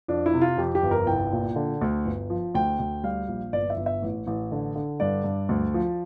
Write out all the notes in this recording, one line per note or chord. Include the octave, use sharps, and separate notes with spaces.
F2 D4
E4
C3
F4
F2 G4
G4
G1
A#4
C2 G5
A#2
D3
D2
G1
F3
D2 G5
D2
G3 F5
A#1
G1 D5
E5
G1
E5
A1
A1
D3
D3
G2 D5
G2
D2
F3